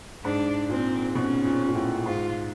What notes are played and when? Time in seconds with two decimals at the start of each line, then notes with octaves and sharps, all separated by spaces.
0.24 G#2 D4
0.69 A#2 C4
1.15 B2 C#4
1.45 A#2
1.68 A#2
1.75 A2
2.06 G#2 F4